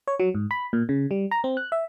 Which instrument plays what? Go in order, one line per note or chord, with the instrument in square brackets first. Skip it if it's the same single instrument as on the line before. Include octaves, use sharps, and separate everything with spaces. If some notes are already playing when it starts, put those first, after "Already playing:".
[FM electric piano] C#5
F#3
G#2
B5
A#2
C#3
G3
A#5
C4
F#6
E5